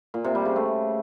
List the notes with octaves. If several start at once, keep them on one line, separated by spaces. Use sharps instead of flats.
A#2
C3
G3
C#3
A3